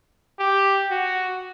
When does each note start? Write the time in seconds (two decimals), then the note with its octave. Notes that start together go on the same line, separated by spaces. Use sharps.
0.39 G4
0.91 F#4